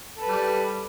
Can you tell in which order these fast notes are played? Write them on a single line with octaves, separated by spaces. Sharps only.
A4 B4 G3